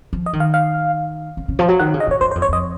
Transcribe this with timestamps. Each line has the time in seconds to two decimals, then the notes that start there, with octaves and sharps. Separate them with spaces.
0.13 F3
0.26 D#5
0.33 D#3
0.40 F5
0.54 F5
1.37 C#3
1.48 C#3
1.59 F3
1.69 F#3
1.79 D#3 F#5
1.94 C#3
2.00 D#5
2.07 G#2 C#5
2.21 F#2 C5
2.31 C5
2.35 F2
2.42 C#5
2.49 F2 D#5